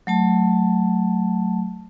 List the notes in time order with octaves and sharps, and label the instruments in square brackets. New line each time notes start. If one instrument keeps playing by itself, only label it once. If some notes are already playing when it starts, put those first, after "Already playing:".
[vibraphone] F#3 A3 A5